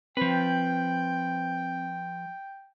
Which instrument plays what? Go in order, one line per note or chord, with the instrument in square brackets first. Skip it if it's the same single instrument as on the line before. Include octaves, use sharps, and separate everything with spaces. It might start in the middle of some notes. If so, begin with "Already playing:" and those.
[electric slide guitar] F3 B4 [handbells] C4 [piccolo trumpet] G5